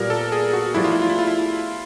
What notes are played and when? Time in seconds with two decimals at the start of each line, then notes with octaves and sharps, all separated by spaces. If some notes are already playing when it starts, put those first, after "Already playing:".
Already playing: A#2 G3 B3 A#4
0.10 A4
0.32 G#4
0.53 F#4
0.74 F3 A3 D4 E4 G4
0.84 F4
0.92 E4
1.02 F4
1.10 E4
1.19 F4
1.27 E4